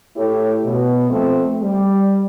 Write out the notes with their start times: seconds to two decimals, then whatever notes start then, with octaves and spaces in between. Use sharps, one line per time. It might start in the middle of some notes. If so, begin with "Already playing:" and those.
0.16 A2 A3 E4 G4 A4 C#5
0.64 B2
1.10 F3 A3 C4
1.62 G3